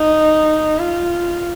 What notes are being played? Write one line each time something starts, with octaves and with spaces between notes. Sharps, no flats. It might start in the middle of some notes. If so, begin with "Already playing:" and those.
Already playing: D#4
F4